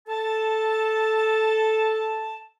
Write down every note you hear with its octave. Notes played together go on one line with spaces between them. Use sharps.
A4 A5